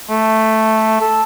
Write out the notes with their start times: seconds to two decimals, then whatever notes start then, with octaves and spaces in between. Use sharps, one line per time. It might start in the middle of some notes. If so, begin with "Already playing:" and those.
0.09 A3
1.01 A4